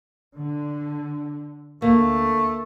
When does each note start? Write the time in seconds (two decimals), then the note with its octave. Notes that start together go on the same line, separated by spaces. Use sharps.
0.38 D3
1.82 D2 A3 A#3